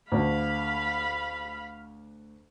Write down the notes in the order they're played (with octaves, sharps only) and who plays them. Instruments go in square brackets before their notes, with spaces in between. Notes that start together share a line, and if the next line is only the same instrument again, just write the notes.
[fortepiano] D2 [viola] F5 B5